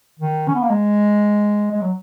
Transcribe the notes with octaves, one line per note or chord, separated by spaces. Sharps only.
D#3
C#4
B3
A#3
G#3
G#3
F#3